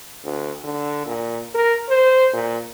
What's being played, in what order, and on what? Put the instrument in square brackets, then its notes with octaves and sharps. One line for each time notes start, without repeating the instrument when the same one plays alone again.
[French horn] D2
D3
A#2
A#4
C5
A#2